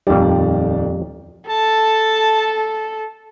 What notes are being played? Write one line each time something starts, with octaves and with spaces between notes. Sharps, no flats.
D#1 F2 D#3 G3 D5
A4 A5